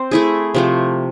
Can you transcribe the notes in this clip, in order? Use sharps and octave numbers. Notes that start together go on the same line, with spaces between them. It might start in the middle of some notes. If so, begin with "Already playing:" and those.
Already playing: C4 C5
A3 E4 G#4
C3 F3 A3